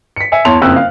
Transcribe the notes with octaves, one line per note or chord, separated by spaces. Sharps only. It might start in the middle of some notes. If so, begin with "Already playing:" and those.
B6 C#7
E5 G#5 C#7
E2 C#5 A5 C6 F7
F#1 F2 C#3 G5 E6 F#6
F5